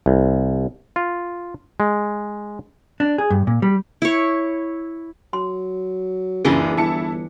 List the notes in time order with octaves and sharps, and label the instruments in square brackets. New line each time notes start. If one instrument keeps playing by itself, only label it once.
[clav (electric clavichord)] C2
F4
G#3
[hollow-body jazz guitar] D4
G#4
G2
A#2
G3
[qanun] E4 C#5
[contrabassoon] F#3 [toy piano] C6
[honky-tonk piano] C#2 F#2 [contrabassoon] A#2 [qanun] E3 D4 D#5 [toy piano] F4 G#4
[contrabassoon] G1 [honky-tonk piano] E4 A5 C#7